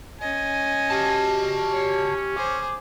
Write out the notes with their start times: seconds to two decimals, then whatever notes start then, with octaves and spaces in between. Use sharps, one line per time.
0.21 C#4 D#5 G#5
0.90 F#4 G4 A5
1.73 C#4 C#5
2.37 G#4 C5 D6